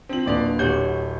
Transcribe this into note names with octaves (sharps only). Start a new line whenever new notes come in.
C4 D4 F4 F#7
D1 A#3 D4 B4 D5
D1 G4 C#5 F#5 G6